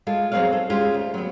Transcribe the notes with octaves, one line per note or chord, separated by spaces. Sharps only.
G#3 F4 A4
F#3 C4 D#4 G#4 C#5 F5
A4
G#3 C#4 F4 G4 G#4
D2
F#3 B3